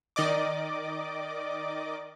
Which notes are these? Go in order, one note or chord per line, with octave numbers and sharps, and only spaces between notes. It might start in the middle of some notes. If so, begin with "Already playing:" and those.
D#3 D5 D#5 D6